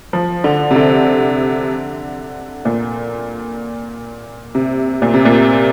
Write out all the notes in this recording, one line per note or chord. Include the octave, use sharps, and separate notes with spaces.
F3
D3
C3
D3
A#2
C3
A#2
C3
A#2